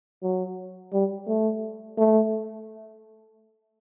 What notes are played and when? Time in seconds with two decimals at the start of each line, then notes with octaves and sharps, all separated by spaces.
0.23 F#3
0.93 G3
1.27 A3
1.98 A3